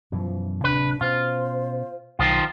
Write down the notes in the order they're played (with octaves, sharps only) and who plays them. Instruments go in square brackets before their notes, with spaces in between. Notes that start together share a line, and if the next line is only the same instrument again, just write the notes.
[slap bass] F#2 B2 E3 [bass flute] F3
[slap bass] D1 C3 [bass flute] D4 [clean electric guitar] B4
[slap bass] B2 C#4 [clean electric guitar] F4 [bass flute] C5
[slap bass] B1 [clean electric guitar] D#3 F3 F4